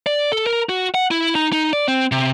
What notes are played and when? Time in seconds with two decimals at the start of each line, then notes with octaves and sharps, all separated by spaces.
0.07 D5
0.32 A4
0.47 A#4
0.69 F#4
0.94 F#5
1.11 E4
1.35 D#4
1.52 D#4
1.73 D5
1.88 C4
2.12 C3